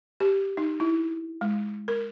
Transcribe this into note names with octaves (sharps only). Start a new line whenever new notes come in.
G4
D#4
E4
G#3
A#4